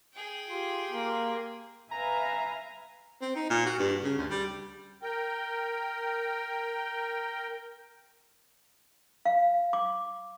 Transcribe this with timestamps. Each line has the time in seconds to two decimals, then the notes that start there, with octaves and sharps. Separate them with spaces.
0.14 G#4 G5
0.49 F4 G4 C6
0.91 A#3
1.91 B4 E5 F5 G#5 A#5
3.21 C4
3.36 D#4
3.50 A#2
3.66 F#4
3.79 G2
4.03 C#3
4.17 D2
4.30 G3
5.02 A#4 G5
9.25 F5
9.73 D6